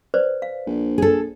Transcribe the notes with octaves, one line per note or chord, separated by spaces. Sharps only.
B4 C5 D5
F5
A#1
G#4 A4